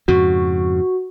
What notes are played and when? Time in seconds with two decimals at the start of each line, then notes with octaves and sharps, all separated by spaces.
0.08 F2 G#2 C#3 F#4